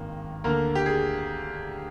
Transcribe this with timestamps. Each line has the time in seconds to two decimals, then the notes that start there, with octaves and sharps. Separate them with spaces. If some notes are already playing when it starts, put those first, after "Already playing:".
Already playing: G#1 G2 D#3 A#3
0.44 D2 D3 A#3 A#4
0.75 G4
0.86 G#4